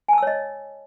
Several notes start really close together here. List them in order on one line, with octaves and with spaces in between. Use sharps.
G#5 A5 E6 C#5 D#5